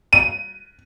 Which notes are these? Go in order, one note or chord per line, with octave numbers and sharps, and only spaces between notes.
D#7